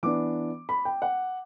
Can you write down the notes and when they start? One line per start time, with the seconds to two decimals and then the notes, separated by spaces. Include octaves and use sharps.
0.03 E3 B3 D4 D6
0.69 B5
0.85 G5
1.02 F#5